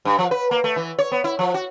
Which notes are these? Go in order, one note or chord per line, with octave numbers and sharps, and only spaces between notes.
G2
F3
B4
A#3
A3
E3
C#5
B3
E4
F3
F#4